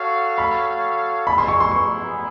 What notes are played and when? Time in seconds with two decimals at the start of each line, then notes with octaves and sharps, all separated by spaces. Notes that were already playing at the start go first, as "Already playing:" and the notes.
Already playing: F#4 A4 C#5 F5
0.38 B5
1.27 B3 E4 G#4 B5
1.38 C6
1.48 C#6
1.60 C6
1.71 C#6